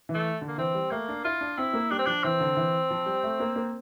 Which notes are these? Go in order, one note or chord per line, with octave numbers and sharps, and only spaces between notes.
E3
A3
D3
A#3
E3 C4
G3
A3 A#3
D4
E4 F4
D4
C4 E4
A#3
G3 D4
C4
F3 D4
E3 C4
D3
E3
F3
G3
A3
A#3
A#3